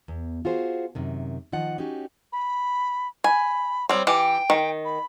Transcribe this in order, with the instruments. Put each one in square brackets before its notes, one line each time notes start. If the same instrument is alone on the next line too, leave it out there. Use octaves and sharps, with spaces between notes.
[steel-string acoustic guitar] E2
F4 F#4 G#4 C5
F#2 C3 D#3
D#3 F3 D#5 F#5
C#4 D#4 F#4 G4
[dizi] B5
[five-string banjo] G#5 [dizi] B5
[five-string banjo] G3 C4 [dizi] C#5
[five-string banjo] E3 G4 [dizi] G5
[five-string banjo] D#3
[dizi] B5